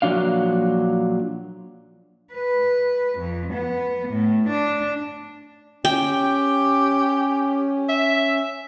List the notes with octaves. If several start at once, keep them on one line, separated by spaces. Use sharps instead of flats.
A#2 F3 F#3 D4 F5
B4
F2
B3
A2
D4
C#4 G4 G5
E5